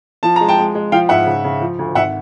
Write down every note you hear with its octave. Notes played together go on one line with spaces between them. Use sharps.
F3 A5
G#3 A#5
G5 A5
G#3
G#3
F3 F5 G5
G#2 E5 F#5
C#3
C#3
F3
D2
G#1 E5 F#5